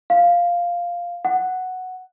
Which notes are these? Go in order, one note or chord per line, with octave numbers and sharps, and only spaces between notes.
F5
F#5